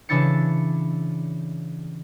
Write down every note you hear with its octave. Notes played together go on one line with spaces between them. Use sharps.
C#3 E3 D4 E4 A6 C#7